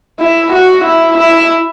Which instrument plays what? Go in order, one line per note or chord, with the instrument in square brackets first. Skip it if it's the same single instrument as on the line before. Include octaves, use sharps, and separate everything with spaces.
[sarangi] E4
F#4
E4
E4